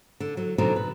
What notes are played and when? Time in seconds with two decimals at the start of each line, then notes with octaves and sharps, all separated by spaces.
0.20 D3
0.37 F#3
0.58 B2 D3 F#3 C4 D#4
0.76 B4